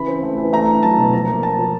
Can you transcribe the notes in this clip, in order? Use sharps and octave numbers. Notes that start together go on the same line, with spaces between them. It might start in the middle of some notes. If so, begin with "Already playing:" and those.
Already playing: C#3 E3 B5
C4
A3
E3
A3 A#5
D4
F#3 A5
B2
F3 A#5
A#3
A#3 A5
F3